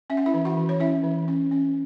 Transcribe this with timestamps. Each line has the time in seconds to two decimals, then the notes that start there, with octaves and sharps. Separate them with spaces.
0.10 C#4 E5
0.17 F#5
0.26 E4 E5
0.34 E3
0.45 F#4 F#5
0.57 E3
0.69 C#5
0.80 C#4 E4 E5
1.04 E3
1.28 C#4
1.51 C#4